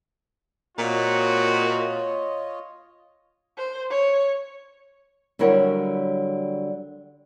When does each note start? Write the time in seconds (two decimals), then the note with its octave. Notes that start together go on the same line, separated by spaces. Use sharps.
0.78 A#2 G#3 C4 F4 F#4 C#5 D#5
3.57 C5
3.90 C#5
5.39 D3 F#3 G3 E4 A#4 C#5